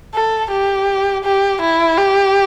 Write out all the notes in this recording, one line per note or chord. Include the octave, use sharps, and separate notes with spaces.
A4
G4
G4
E4
G4